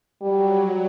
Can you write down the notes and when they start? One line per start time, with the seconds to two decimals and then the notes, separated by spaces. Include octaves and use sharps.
0.22 F#3 G3